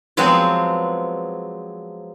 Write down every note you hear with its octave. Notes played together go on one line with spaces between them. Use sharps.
F3 F#3 G#3 B3 C4